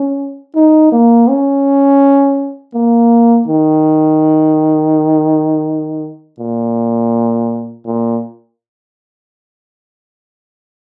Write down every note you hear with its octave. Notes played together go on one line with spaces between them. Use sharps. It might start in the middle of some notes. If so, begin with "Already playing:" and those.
Already playing: C#4
D#4
A#3
C#4
A#3
D#3
A#2
A#2